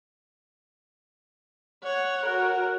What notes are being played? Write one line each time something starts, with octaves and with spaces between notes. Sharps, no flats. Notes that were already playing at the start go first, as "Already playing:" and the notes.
C#5 F#5
F#4 A#4 F#5